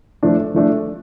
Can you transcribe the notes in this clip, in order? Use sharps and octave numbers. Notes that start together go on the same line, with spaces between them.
F3 A3 D4
F3 A3 D4